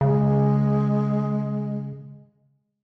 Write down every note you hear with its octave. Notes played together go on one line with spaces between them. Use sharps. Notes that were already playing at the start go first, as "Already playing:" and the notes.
C#3 G#3